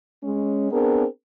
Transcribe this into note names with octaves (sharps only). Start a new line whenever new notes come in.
G#3 C#4
B3 C4 D4 G#4 A#4